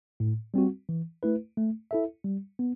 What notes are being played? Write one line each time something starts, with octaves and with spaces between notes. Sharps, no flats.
A2
G3 C4 F#4
E3
A3 E4 B4
A3
E4 A4 E5
G3
B3